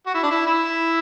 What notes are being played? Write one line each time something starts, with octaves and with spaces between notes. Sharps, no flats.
F#4
E4
D4
E4
E4